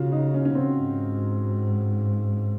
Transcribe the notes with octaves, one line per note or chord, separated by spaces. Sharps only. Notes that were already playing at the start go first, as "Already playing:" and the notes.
Already playing: C#3 F4 F#4
D#4
C#4
C#4
C4
G#2